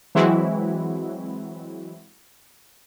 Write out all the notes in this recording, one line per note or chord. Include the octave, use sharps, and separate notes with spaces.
E3 F#3 G#3 C4 E4 F#4